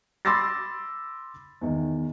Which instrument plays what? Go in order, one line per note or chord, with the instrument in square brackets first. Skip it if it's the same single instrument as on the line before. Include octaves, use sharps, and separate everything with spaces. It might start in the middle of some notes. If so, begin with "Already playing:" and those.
[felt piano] B5 C6 D6 E6 A6 A#6
E2 D#3